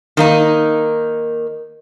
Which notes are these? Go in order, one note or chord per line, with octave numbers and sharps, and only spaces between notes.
D#3 A#3 D#4